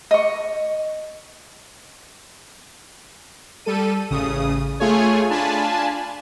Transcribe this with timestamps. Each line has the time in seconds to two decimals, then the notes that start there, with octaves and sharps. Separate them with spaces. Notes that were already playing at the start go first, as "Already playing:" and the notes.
0.11 D#5 C#6
3.65 G3 A4 D#7
4.11 A1 C#3 D#6
4.79 A3 F4 G#4 C#5 G#5
5.30 D4 F4 G#5 A5 B5